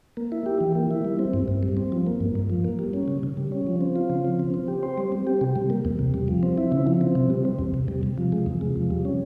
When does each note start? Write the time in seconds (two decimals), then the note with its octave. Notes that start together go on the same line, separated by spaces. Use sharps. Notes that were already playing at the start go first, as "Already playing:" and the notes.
0.17 A#3
0.32 E4
0.46 G4
0.61 E3
0.75 A#3
0.91 E4
1.05 G3
1.19 C4
1.34 G2
1.48 G2
1.63 G3
1.77 C4
1.92 F3
2.06 A#3
2.20 G2
2.35 G2
2.50 F3
2.65 A#3
2.79 G3
2.93 C#4
3.08 C#3
3.23 C#3
3.37 G3
3.52 C#4
3.67 F3
3.81 C4
3.96 F4
4.10 C#3
4.25 F3
4.39 C4
4.54 C4
4.68 G4
4.83 C5
4.98 G3
5.12 C4
5.27 G4
5.41 C3
5.56 G3
5.70 A#3
5.85 E2
5.99 C3
6.14 G3
6.28 F3
6.43 C4
6.58 E4
6.72 C#3
6.87 F3
7.01 C4
7.15 C3
7.30 G3
7.45 C4
7.59 E2
7.74 C3
7.88 G3
8.03 C3
8.18 F3
8.32 G#3
8.46 E2
8.61 C3
8.76 F3
8.90 G3
9.05 C#4